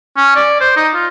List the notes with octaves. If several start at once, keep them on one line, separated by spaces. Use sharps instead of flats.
C#4
D5
C5
D#4
F4